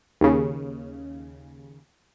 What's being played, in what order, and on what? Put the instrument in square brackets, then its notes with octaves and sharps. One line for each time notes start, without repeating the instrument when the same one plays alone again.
[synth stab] D#2 C#3